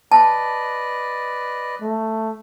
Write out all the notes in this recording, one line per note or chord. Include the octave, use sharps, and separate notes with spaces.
B4 D5 D#5 A5
A3